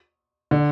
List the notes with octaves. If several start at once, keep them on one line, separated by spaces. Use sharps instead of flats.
D3